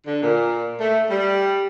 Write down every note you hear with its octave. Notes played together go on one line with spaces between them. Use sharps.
D3
A#2
A3
G3